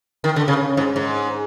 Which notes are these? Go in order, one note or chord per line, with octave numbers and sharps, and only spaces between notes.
D#3
D3
C#3
G#2
G#2